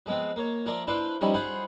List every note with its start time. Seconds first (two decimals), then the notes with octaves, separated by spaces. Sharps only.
0.06 F3 G#3 B3 C4
0.36 A#3 C#5
0.66 F3 F4 A#4 D5 E5
0.87 D4 E4 F4 B4 C5
1.21 F3 G3 C#4 D#4 E4
1.34 F4 G#4 C5 F#5 B5